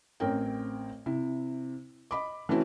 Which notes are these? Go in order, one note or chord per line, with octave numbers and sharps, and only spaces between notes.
A1 C4 C#4 A#4 G5
C3 E4
D#5 B5 D6
E3 A3 C4 C#4 E4 F#4